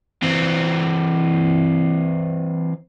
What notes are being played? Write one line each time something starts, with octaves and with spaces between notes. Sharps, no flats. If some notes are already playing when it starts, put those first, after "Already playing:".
E3 C4